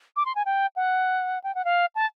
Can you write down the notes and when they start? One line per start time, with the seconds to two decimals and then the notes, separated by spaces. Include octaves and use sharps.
0.16 D6
0.25 C6
0.35 G#5
0.46 G5
0.76 F#5
1.44 G5
1.55 F#5
1.65 F5
1.95 A5